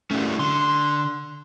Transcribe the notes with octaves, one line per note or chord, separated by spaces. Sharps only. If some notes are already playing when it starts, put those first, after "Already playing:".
G3 A3 C#4 E4 F#4
D3 C6